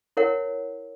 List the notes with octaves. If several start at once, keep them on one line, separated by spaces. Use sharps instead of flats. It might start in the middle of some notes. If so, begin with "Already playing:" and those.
E4 A#4 C#5 F#5